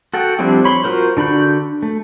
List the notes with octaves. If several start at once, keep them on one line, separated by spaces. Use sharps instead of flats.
F#4 A4 F#5 G5
F3 G3 C4 D4 E4
C#5 B5 C6
F4 F#4 A#4 C5
D3 D4 F#4 B5 G6
A3